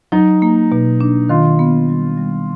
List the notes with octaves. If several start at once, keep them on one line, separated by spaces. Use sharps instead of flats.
F#3 D#4
A#3
B2
D4
D#3 F4
B3
G3
G3